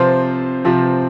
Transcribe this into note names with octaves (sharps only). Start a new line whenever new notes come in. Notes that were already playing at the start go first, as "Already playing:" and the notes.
Already playing: C3 F3 C4 F4 C5
C3 F3 C4 F4